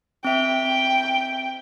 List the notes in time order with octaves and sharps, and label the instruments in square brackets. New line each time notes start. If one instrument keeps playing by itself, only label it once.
[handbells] C4 E5 [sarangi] G5